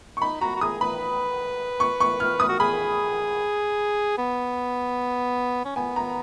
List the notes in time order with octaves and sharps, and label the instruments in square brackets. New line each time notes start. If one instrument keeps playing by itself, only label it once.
[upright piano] C#6
[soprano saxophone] D#4 [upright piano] B5
[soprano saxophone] F#4 [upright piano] A#5
[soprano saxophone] F#4
[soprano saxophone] G#4 [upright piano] D#6
[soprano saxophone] B4 [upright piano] B5
[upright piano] C#6
C#6
F6
D#6
[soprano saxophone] F#4
[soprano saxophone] G#4 [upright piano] B5
[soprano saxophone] B3
C#4
[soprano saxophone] B3 [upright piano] G#5
[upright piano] A#5